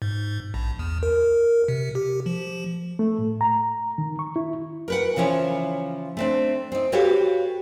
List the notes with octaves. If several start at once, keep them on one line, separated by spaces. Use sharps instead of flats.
G#2
A#1
E2
A#4
C3
G4
F3
A3
A2
A#5
D#3
C#6
E4
A#4 B4 F#5
C#3 E3 F3 E4 C#5
A3 C4 D4
C4 D#4
F#4 G4 A4 B4 C#5 F5